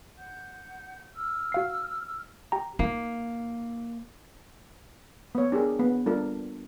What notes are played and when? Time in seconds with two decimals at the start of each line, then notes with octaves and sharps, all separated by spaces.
0.16 F#5 G6
1.15 E6 F6
1.52 F#4 F5 C7
2.52 G4 G5 A#5
2.79 A#3 D#4
5.35 B3 C#5
5.52 D4 G4 G#4 A#4
5.79 B3
6.06 G3 D4 F4 A4 A#4